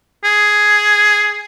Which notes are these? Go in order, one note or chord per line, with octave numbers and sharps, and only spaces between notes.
G#4